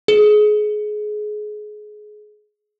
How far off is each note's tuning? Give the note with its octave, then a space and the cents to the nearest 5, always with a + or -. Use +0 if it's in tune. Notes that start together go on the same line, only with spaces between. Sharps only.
G#4 +25